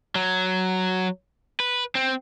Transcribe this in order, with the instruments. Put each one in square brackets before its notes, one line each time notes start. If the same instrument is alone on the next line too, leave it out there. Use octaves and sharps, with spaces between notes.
[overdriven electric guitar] F#3
B4
C4